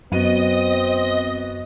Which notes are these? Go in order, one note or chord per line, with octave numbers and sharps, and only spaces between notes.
F#2 B3 C4 F#4 D#5 D#6 D#7